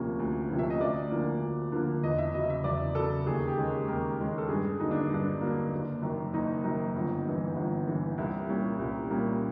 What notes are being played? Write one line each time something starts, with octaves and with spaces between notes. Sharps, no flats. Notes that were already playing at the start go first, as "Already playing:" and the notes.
Already playing: D2 C3 F3 A#3 C#4
D2
C3 F3 A#3 C#4
E5
D#5
D2 D5
D3 F3 A#3
D2
D3 F3 A#3
E2 D#5
E5
C#3 F#3 D#5
E5
E2 D5
C#3 F#3 A4
D#2 G#4
G4
D#3 G#3 C#4
D#2 A#4
D#3 G#3 C#4
A4
G2 G#4
D3 F#3 A#3 D#4
D4
G2 D4
D3 F#3 A#3
F#1
F#2 D#3
F#1 D#4
F#2 D#3
G1
G2 E3
G1
G2 E3
C2 E4
A#2 G3 A#3 C#4
C2
A#2 G3 A#3 C#4